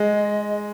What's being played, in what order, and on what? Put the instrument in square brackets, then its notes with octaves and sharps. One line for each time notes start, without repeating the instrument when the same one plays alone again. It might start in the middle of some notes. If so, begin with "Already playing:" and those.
Already playing: [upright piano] G#3 [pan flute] D#5